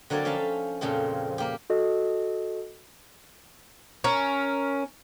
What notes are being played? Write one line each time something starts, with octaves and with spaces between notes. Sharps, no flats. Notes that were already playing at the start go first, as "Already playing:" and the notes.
D3 F#3 A#3 C4 D5 G#5
F3 C#4 E5 F5 A5
F2 A#2 C#3 F3 C4
A#3 G4
F#4 A4 D#5
C#4 A#4